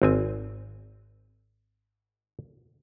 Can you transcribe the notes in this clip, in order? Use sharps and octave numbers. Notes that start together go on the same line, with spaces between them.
G#1 C4 G#5